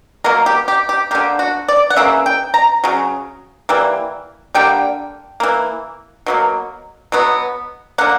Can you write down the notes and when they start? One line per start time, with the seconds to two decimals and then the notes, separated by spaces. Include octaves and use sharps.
0.24 B2 F#3 A#3 A#4
0.46 G4
0.68 G4
0.89 G4
1.11 D3 A#3 G4
1.39 F#4
1.68 D5
1.90 F#5
1.96 C#3 E3 A#3 E5
2.26 G5
2.54 A#5
2.84 C#3 F#3
3.69 E3 G3 A#3
4.55 D3 G3 A#3 G5
5.40 E3 A#3
6.26 B2 F#3 A#3
7.12 B2 F#3 B3
7.98 D3 A#3 F#5